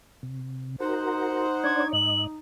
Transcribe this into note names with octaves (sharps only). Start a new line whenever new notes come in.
C3
D#4 F#4 A#4 C5 F#5
D4 C#5 D5 G#6
G#2 D#5 F#7